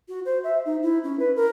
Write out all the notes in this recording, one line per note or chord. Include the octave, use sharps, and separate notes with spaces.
F#4
C5
E5
D#4
E4
C#4
B4
A#4